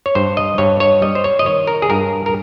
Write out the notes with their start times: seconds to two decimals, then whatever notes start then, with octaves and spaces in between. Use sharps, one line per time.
0.06 C#5
0.15 G2 C5
0.37 D#5
0.58 G2 C#5
0.80 C#5
1.02 G3 D#5
1.15 C5
1.24 C#5
1.39 D#5
1.46 D#3 C#5
1.67 A#4
1.82 G#4
1.90 G2 A#4
2.26 A#4